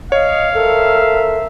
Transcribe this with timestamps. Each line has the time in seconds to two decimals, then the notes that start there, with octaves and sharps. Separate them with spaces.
0.12 C#5 D#5 F5
0.54 A4 A#4 C5 E5